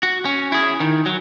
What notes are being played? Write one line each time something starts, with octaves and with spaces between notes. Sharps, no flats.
F#4
C#4
E4 G#4
D#3
F#3